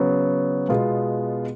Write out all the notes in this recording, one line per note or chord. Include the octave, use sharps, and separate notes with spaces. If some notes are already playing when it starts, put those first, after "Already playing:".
Already playing: C#3 F#3 B3
B2 G#3 B3 F4